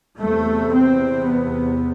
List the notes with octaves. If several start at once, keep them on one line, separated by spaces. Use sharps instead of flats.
E2 C3 A3
C4
B3